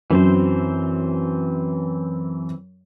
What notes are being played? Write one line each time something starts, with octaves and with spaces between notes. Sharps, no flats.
F#2 E3 F#3 C4 C5